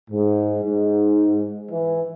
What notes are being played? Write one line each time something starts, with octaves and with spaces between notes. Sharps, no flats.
G#2
G#2
E3